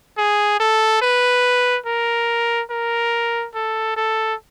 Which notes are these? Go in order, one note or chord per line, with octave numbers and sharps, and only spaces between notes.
G#4
A4
B4
A#4
A#4
A4
A4